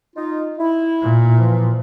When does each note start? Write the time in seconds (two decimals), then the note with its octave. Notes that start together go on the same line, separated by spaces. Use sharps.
0.16 D#4 F4
0.59 E4
1.02 A#2
1.37 E3 F3